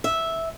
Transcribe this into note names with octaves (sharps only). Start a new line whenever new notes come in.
E5